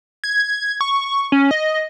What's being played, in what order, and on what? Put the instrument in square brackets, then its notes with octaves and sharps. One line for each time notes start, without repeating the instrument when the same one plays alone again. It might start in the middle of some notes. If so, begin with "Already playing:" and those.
[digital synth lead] G#6
C#6
C#4
D#5